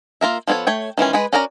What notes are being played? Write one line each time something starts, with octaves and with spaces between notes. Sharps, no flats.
A#3 F4 A#4 E5
F3 B3 E4 A4 C#5
A3 C#5 G5
D#3 E3 G#3 C#4
G#3 G#4 B4
C#4 F#4 A#4 D5 A#5